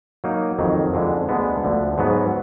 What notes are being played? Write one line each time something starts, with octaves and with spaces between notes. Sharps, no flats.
F#3 A#3 D#4
F2 D#3 F#3
F2 D3 G#3
D2 D3 G#3 B3
D2 D3 F3
G#2 F#3 B3